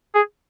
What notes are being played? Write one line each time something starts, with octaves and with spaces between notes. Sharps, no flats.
G#4